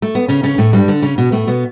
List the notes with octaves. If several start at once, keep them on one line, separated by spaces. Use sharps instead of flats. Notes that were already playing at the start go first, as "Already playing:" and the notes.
A3
B3
C#3 C#4
C#3 C#4
A2 A3
G2 G3
D3 D4
C#3 C#4
B2 B3
A2 A3
B2 B3